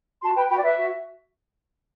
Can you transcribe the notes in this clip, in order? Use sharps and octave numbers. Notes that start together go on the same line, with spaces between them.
F#4 A5 C6
B4 G5 B5
F#4 G5 B5
D5
B4 E5
F#4